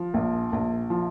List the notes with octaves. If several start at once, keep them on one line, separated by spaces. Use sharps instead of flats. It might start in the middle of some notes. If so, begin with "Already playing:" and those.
Already playing: F3
A#1
A#1
F3